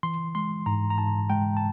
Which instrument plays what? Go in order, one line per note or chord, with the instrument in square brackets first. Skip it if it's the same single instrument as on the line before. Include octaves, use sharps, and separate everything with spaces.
[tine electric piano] E3 C6
G#3 C6
G#2 A#5
A#5
G#2 A5
G#3 G5
A5